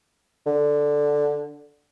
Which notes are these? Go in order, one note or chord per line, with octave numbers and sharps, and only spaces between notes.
D3